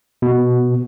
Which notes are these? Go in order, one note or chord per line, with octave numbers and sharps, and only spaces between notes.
B2